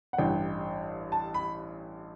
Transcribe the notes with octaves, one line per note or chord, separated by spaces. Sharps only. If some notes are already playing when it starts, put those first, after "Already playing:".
F#5
A1 G2 E3 G5
A5
B5